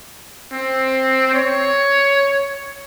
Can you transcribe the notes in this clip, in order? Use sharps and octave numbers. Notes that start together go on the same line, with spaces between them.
C4
C#5